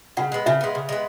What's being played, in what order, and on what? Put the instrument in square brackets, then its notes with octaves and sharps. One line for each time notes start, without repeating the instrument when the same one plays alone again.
[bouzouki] C#3 [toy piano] F#5
[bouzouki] G#3 B3
[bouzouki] C#3 [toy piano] E5
[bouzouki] G#3 B3
C#3
G#3 B3